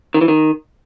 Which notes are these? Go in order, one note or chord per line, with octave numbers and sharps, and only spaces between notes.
D#3
E3
D#3